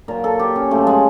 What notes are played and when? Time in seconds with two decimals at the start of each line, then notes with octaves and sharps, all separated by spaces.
0.08 A#2 F#3 A#4
0.24 A4
0.39 G4
0.56 C#4
0.71 F#2 C#3 F3 A3
0.87 G#3